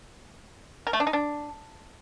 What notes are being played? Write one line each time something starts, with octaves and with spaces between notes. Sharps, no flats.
A#4
A3
D4
D#4
D4